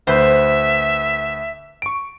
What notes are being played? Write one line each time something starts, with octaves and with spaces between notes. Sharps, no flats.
D2 B4 C5 E5
C#6 D7